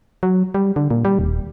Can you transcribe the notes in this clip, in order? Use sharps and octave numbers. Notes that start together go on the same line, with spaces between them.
F#3
G3
D3
A#2
G3
D#1